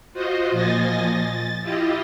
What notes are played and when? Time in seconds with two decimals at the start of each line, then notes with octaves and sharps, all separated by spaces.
0.13 F4 F#4 C5 D#5
0.51 A#2 F3 D#5 G#5 A6 A#6
1.17 A6
1.62 E4 F4 G4 D#5